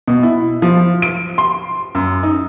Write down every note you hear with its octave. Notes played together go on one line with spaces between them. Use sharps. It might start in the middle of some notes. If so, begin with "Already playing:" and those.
B2
E4
F3
D7
C6
F#2
D#4